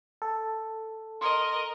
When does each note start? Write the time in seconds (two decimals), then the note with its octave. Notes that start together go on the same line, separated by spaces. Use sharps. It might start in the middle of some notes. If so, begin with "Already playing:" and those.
0.22 A4
1.21 A#4 D#5 C6